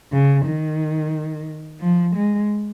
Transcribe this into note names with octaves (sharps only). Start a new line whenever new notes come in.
C#3
D#3
F3
G#3